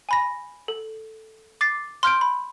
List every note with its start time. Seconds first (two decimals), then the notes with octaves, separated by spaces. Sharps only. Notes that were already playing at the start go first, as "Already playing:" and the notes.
0.09 G#5 B5 A#6
0.68 A4
1.61 D6 A6 C7
2.03 C6 F6 G6 D7
2.21 B5